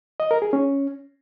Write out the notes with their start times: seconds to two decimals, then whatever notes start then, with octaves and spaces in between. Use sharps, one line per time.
0.20 D#5
0.31 A#4
0.42 G#4
0.53 C#4